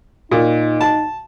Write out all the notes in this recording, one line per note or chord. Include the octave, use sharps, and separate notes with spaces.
A#2 D#4
A5